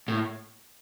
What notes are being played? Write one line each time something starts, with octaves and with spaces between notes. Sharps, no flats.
A2